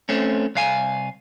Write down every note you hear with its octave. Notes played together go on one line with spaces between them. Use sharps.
A3 C4 C#4
C2 F5 G#5